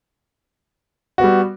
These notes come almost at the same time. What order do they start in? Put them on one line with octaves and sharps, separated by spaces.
F#4 B3 G3